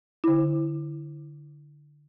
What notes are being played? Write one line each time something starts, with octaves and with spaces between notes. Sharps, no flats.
D3 E4